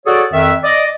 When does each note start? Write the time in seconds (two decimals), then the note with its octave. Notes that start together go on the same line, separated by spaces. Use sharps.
0.06 F#4 G#4 A4 C#5 D5
0.33 F2 D#3 E5
0.64 D5 D#5